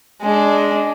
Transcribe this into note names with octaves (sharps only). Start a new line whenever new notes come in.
G#3 D4